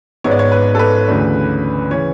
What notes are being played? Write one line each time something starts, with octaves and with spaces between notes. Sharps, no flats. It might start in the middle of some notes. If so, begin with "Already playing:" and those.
G#1 G#2 G#3 B3 C#5
D5
C#5
B4
A4
B4
D2 C#3 E3 A3 D4
C#3 E3 C#5